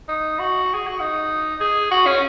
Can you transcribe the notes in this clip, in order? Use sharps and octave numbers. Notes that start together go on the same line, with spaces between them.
D#4
F#4
G#4
F#4
D#4
G#4
F#4
C#4